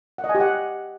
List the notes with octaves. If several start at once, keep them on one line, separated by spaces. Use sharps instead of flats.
F#5
D#5
G#5
G4
F#5